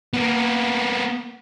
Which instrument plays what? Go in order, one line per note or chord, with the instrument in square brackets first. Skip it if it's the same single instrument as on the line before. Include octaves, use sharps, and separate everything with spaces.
[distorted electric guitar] A#3 B3